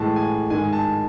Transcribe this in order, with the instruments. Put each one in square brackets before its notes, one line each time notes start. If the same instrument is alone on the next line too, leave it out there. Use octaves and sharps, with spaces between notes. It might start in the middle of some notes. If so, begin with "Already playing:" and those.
Already playing: [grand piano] A2 E3 G#3 A5
G#5
G#2 D#3 G#3 G#5
A5